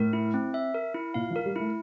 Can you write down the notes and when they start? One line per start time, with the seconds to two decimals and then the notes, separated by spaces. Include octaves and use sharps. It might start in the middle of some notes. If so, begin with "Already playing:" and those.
Already playing: A2 A#4
0.13 E4
0.34 C4
0.54 E5
0.74 A#4
0.94 E4
1.14 A#2 F5
1.31 F3
1.36 A#4
1.46 G3
1.56 A3 E4